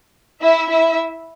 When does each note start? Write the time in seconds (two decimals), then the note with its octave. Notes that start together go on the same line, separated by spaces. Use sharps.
0.41 E4 E5
0.69 E4 E5